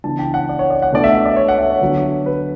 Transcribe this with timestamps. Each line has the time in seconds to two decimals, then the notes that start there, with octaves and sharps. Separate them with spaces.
0.04 C#3 E3 B3 D4 A5
0.19 G5
0.34 F#5
0.49 D5
0.59 C#5
0.70 D5
0.82 F#5
0.92 B2 A3 D4 D5
1.04 E5
1.15 E5
1.26 D5
1.36 C#5
1.48 F#5
1.58 E5
1.70 C#5
1.81 D3 F#3 B3 D4
2.26 B4